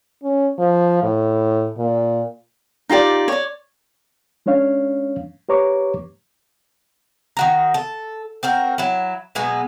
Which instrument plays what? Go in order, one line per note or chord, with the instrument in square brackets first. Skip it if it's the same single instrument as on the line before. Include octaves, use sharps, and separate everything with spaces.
[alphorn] C#4
F3
A2
A#2
[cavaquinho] D#4 F4 G4 D5
C#5 D5
[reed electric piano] G#3 C#4 D4 C#5 F5
G4 B4 C#5 A#5 C#6 D6
[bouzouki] D#3 F#4 A#5
A4
C4 F#4 A#4
F#3 E4
B2 F#3 G#3 B3